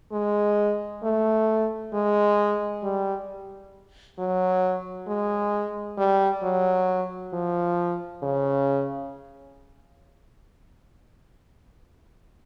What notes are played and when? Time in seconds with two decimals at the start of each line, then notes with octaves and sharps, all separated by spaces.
0.12 G#3
1.03 A3
1.93 G#3
2.83 G3
4.18 F#3
5.07 G#3
5.98 G3
6.43 F#3
7.33 F3
8.23 C#3